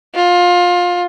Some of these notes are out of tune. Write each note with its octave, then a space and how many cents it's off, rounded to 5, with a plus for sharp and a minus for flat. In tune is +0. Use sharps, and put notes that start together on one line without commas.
F4 +20